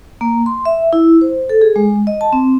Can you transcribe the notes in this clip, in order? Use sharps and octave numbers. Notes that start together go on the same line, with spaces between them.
A#3
C6
E5
E4
C5
A4
G#4
G#3
D#5
A5
C4